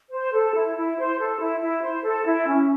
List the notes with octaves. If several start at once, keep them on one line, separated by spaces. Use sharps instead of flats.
C5
A4
E4
E4
C5
A4
E4
E4
C5
A4
E4
C#4